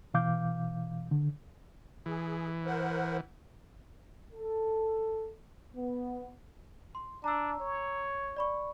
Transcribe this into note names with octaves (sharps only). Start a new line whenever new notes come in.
B2 E3 F5 D6 G6
D3
E3 G#4
A#4 C5 F#5
A4
B3
C6
D4 A#5 E6
C#5
D5 B5 C#6